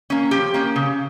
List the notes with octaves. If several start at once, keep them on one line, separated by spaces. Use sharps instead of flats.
A#3 C#4
F3 G4
A#3 C#4
C#3